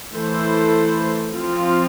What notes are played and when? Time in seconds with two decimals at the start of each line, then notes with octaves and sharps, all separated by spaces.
0.14 E3 A3 E4 A4 C5
1.33 F3 C4 F4